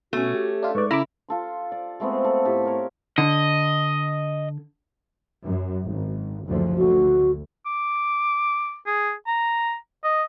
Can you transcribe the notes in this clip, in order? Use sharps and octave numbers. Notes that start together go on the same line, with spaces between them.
B2 A3 C#4 F#4
G4
D4 F4 E5
G#2 B4 D5 C#6
C#3 C#4 E4 A#5 B5 D6
F4 A4 C6
D5
G#3 A3 B3 C4
A4
A2 G4 A5
A#4 C#5
D3 D#5
F#2
G#1
F#1 D2 F3
D2 F#4
D6
G#4
A#5
D#5